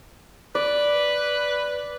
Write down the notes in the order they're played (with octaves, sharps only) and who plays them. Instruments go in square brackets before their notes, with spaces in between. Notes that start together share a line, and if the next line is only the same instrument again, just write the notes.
[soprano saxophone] B4 [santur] D5